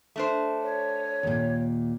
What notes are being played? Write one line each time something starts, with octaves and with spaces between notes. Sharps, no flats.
A3 D4 C5
C#5
D#2 A#2